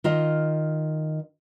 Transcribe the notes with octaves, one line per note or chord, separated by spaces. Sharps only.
D#3 F4 D#5